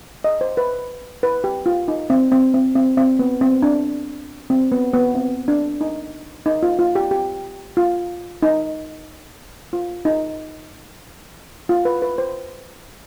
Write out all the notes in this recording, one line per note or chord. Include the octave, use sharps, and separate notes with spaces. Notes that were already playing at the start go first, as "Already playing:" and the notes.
D#5
C5
B4
B4
G4
F4
D#4
C4
C4
C4
C4
C4
B3
C4
D4
C4
B3
B3
C4
D4
D#4
D#4
F4
F4
G4
G4
F4
D#4
F4
D#4
F4
B4
B4
C5